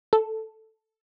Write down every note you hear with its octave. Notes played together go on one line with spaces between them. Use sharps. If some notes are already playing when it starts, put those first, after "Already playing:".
A4